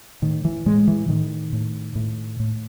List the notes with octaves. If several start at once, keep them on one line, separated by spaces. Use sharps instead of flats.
A2 D#3
E3
A2 G#3
E3
A2 D#3
A2
A2
A2